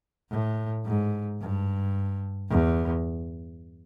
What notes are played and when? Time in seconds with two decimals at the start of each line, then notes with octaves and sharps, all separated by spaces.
0.31 A2
0.85 G#2
1.40 G2
2.50 E2